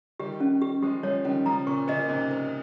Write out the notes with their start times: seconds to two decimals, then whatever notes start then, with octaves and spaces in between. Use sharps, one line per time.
0.19 D#3 G3 G4
0.40 C#4
0.62 G4
0.82 F3 G#3 G4
1.03 F3 G#3 C#5
1.24 D#3 G3 C#4
1.46 C#3 F3 A#5
1.67 A#2 C#3 C#6
1.88 A#2 C#3 D#5
1.99 A#2
2.09 G#2 C3 D#5
2.31 C5